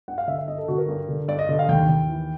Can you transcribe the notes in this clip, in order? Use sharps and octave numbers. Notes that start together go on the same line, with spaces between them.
G2 F#5
F5
D3 E5
E5
G2 D#5
A4
D3 F#4
A#4
G2
D3
G2 D5
D#5
D3
F5
D#2 G5
D#2
E3